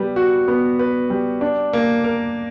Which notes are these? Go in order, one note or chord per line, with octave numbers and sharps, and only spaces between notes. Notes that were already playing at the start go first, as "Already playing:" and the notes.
Already playing: G3 B3 B4
F#4
B3
B4
G3
D4
A#3
A#4